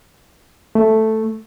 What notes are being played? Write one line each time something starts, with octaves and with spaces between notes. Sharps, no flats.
A3